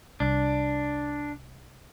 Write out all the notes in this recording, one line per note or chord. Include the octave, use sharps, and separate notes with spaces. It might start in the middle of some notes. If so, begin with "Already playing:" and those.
C2 D4